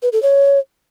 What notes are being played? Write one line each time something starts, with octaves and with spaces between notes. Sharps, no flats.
B4
A4
C#5